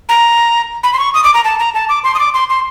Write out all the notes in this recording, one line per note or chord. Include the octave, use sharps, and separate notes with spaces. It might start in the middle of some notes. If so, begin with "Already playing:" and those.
A#5
B5
C6
C#6
D#6
D6
A#5
A5
A#5
A5
D6
C6
D#6
D6
C6
C6